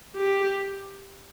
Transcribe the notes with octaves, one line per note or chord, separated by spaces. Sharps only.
G4